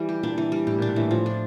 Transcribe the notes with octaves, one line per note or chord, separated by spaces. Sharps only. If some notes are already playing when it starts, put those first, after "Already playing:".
Already playing: E3 G3
G4
A#2 D4
E3
G3
A2 G4
A#2
D4
A#2
A2 E3
A2 F3
D4